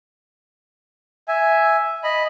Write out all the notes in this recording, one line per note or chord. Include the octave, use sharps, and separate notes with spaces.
E5 G#5
D#5 B5